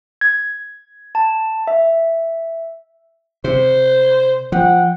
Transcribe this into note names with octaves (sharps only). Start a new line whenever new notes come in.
G#6
A5
E5
C3 C5
F3 F#5 G5